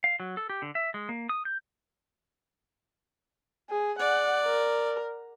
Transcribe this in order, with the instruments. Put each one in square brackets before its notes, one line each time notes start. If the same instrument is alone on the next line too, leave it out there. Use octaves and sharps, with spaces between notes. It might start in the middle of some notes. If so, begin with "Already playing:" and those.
[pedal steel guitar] F5
F#3
A4
G4
D3
E5
G#3
A#3
D#6
G6
[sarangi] G#4
[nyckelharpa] D5 [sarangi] F#5
[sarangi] A#4